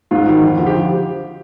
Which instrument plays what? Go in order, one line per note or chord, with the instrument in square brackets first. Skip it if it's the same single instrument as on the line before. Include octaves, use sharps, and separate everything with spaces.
[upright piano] G#2 F4
D#3 F#3
F2
D3 F3
G4